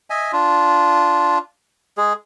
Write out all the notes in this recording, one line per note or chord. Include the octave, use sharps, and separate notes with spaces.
D#5 E5 G#5
D4 F4
G#3 G#4